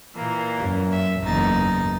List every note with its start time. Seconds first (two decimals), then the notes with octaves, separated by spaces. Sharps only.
0.16 A#2 E3 A#3
0.59 F#2
0.92 E5
1.22 F#1 E2 D#4 A6